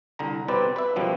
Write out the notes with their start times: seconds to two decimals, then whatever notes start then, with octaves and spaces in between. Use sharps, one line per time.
0.19 C2 D3 A#5
0.48 B2 G3 C4 B4 D5
0.76 B4 E5
0.96 F#2 B2 F3 G3